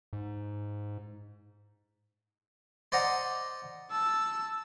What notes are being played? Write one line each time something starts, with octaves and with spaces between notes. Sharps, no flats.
G#2
C5 D5 D#5 F#5 A#5
A5 E6